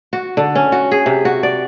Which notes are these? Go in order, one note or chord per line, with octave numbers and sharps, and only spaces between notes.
F#4
D3
C#4
F#4
G#4
C3
F#4
D5